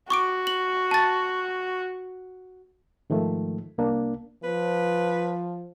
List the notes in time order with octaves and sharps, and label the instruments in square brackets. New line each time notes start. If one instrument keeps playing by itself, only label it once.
[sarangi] F#4 [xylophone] C#6 D6 D7
[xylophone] F#7
A5 A6
[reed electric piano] G#2 D#3 F3 A3
C2 A#3 D4
[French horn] F3 [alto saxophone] B4